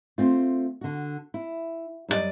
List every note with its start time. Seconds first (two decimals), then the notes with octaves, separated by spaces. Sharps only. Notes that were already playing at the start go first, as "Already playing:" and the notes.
0.18 A3 C4 F4
0.81 D3 F#4
1.34 E4
2.08 F#2 G3 D4 D5 D#5